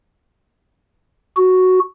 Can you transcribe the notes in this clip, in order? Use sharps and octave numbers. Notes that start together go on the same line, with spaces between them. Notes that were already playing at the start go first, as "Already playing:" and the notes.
F#4